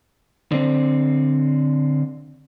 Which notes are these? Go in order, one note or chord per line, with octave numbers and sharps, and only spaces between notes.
D3 C4